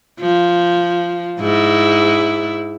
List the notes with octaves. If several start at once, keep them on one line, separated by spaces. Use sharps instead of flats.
F3
G#2 E4